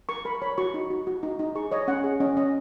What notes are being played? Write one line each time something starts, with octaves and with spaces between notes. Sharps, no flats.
A#4 C#6
A#4 B5
C#5 B5
F#4 C#6
D#4
F#4
F#4
D#4
D#4
G#4 C#6
C#5 D#5
C#4 F#5
G#4
C#4 D#5
C#4 D#5